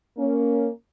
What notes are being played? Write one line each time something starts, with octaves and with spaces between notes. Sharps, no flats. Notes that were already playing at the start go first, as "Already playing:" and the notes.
A#3 C#4